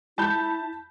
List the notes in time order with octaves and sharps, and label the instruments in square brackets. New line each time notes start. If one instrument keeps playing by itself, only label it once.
[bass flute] E4 [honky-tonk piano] A5 B5 G6